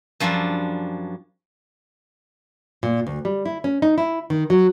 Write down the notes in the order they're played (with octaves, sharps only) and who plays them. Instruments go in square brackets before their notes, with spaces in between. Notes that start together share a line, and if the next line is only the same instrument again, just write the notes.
[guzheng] F#2 F3 G3 D4 E5
[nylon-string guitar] A#2
D2
G3
E4
C#4
D#4
E4
D#3
F#3